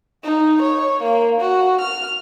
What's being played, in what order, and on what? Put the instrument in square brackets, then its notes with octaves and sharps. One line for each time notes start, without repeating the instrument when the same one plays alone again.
[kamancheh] D#4
C#5
A#3
F#4
F6